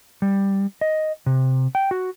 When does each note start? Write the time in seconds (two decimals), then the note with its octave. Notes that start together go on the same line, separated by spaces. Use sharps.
0.22 G3
0.81 D#5
1.26 C3
1.75 G5
1.91 F#4